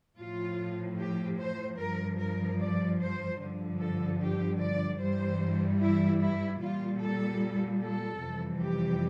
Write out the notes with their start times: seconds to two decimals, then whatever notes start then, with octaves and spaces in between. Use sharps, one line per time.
0.19 A2 F3 F4
0.99 G4
1.39 C5
1.79 G2 F3 A#4
2.19 A#4
2.59 D5
2.99 C5
3.39 G2 D3 F3
3.79 A4
4.19 G4
4.60 D5
4.99 G2 E3 G3 C5
5.79 E4
6.20 E4
6.60 A#2 G3 F4
7.00 A4
7.80 A4
8.20 F2 C3 E3 G3
8.60 G4